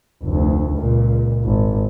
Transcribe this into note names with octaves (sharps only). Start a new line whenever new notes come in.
F1 D2
C#2 A#2
G#1